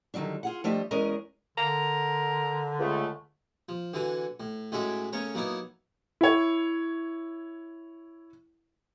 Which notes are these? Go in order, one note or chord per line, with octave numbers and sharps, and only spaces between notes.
D3 D#3 F#3 G3 D4
F4 G#4 F#5
F3 G3 A3 D4 G4 D#5
E2 G#3 C#4 G#4 A#4 D#5
D3 A#4
C#2 A3
F3
D3 E3 F#4 G#5
A2
A2 G#3 C#4 F#4 E5 D6
C#3 A3 C#4 A#4 C#5
F#3 A#3 B3 D#4 E4
E4 C#5